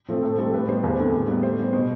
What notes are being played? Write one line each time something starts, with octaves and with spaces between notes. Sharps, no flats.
F3 A3 C4
A2 A4
G3 C4 A4
A2 B4
G3 B3 C5
E2 B4
D3 A3 C4
A2
G3 B3
A2 C5
G3 B3
B2 C5